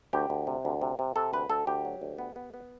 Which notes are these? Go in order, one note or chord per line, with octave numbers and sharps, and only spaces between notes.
D2 G4
D2
C3
D2
C3
C3
C3 A4
D2 B4
D2 A4
D2 G4
F#3
D2
B3
B3
B3